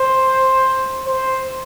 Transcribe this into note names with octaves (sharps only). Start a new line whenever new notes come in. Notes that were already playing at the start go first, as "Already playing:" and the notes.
Already playing: C5
C5